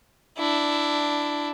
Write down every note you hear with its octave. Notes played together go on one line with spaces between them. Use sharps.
D4 E4